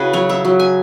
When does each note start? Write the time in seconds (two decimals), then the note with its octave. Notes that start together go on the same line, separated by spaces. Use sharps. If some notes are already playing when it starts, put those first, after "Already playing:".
Already playing: C#3 E4 F#4 G#4 B4
0.13 F#3 C#5
0.29 E5
0.45 F#3
0.60 G#5